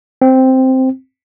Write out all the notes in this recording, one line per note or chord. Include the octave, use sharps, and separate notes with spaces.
C4